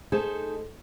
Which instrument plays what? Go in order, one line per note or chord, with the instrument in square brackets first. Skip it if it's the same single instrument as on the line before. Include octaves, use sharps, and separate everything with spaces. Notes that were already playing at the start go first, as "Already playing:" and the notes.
[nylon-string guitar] A3 D#4 G#4 A4 C5